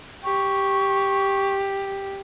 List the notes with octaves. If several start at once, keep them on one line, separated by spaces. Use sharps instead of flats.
G4 C#6